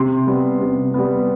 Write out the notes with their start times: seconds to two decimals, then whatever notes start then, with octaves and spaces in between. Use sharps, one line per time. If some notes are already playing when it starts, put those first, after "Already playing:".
Already playing: C3 C6
0.27 G3 B3
0.61 C3
0.94 G3 B3